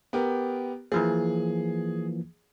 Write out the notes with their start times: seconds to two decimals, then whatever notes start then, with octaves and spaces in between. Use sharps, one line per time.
0.13 B3 G4 A#4
0.92 E3 F3 A#3 G#4